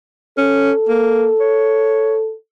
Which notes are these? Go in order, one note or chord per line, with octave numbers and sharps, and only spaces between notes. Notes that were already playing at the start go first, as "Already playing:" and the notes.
C#4 A4
A#3
C#5